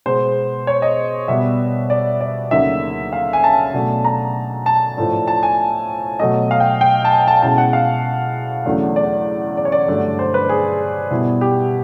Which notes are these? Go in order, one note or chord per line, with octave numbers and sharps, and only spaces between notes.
B2 G#3 B3 C5
C#5
D#5
B2 G3 B3 E5
D5
D5
D2 C#3 F#3 A#3 D#4 E5
F5
G#5
A5
B2 F#3 A3 D4
A#5
A5
A2 F3 A3 D4
A5
G#5
B2 F#3 A3 D#5
F5
G5
G5
A5
G#5
A5
B2 G#3 C#4 E4 A5
F#5
F5
E2 C#3 F#3 A3 D4
D5
D5
C#5
D5
G2 D3 F#3 A3 D4
C5
B4
G#4
B2 G3 B3 E4
G4